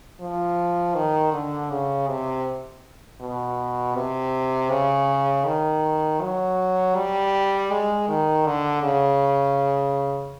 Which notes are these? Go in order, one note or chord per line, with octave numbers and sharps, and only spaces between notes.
F3
D#3
D3
C#3
C3
B2
C3
C#3
D#3
F#3
G3
G#3
D#3
D3
C#3